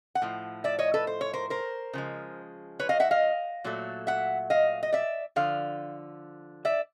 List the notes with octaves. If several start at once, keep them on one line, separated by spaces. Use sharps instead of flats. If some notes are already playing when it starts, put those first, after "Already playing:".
F#5
A2 F3
D5 E5
C#5 D#5
A4 B4
C5
C#5
A#4 C5
A#4 C5
C#3 F3 G#3
B4 C#5
D#5 F5
E5 F#5
D#5 F5
A#2 F#3 A3
E5 F#5
D#5 F5
D#5
D5 E5
D3 F3 F5
D5 E5